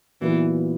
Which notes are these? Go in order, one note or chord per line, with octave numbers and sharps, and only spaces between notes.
A#2 E3 F#3 B3